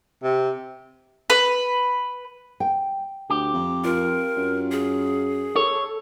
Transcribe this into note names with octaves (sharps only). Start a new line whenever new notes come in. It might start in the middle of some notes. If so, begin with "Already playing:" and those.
C3
B4
G5
D2 G4
F2
F4 A#4
F#2
G#4
A4 C#5